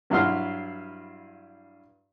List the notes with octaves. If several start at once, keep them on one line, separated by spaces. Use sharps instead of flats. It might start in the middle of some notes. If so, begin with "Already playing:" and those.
G2 F#3 E4 F5 C6 F6